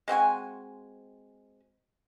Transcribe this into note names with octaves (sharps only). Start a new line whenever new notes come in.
G#3 C4 F#4 G#5